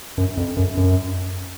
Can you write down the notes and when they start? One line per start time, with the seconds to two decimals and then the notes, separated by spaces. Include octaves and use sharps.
0.18 F#2
0.37 F2
0.57 F#2
0.77 F#2